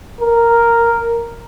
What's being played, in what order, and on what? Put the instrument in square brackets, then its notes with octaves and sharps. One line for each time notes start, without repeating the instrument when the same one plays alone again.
[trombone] A#4